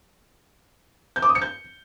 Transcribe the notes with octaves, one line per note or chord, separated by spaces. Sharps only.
G6
D6
D#6
C#7
G6